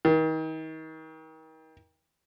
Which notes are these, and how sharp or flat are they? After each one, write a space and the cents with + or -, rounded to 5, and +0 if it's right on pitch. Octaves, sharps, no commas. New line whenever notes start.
D#3 +35